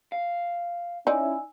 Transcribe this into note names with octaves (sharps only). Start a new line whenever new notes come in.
F5
C#4 D#4 E4 D5 G#5 E6